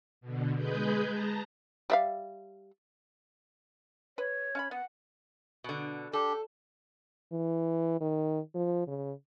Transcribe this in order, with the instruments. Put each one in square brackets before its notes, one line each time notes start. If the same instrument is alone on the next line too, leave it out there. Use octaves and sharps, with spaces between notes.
[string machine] B2 D3
G#3 G#4 B4 G6
A5 A#5 A#6
[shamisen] G3 E5 F5
[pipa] B4 [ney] C#5
[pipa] C#4 F5 B5
[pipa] B3 [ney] F#5
[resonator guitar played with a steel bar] B2 D3
[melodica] D4 G4 [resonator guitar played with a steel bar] A4
[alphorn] E3
D#3
F3
C#3